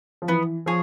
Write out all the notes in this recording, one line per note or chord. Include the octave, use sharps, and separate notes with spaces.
F3
E3 B3
F3 G#4 C#5